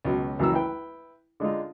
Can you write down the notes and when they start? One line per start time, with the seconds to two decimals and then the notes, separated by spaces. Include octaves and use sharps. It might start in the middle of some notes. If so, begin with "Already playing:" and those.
0.05 C#2 B2 F#3
0.39 C#2 E3 F#3 A#3 A#5 E6
0.53 E4 B4 G5
1.40 D3 G#3 D#4 F4